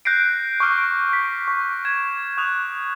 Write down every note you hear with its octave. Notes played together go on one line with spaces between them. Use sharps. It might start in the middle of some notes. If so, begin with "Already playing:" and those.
F#6 G6 A#6 C7 D7
C#6 D6 F6 D7
B6
C#6
G6 G#6 E7
C#6 D#6 F#6 F7